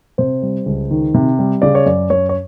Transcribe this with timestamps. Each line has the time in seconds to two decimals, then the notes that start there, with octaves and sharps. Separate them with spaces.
0.18 C3 C5
0.42 G3
0.66 C#2
0.91 D#3
1.14 C3
1.39 G3
1.62 C#3 D5
1.75 C#5
1.86 F#2 D5
2.10 F#2 C#5
2.29 C#5